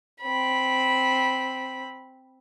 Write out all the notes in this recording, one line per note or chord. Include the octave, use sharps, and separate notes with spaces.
C4 B5